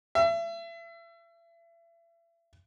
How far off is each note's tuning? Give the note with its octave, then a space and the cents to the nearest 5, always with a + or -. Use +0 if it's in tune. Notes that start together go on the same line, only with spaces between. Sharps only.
E5 +35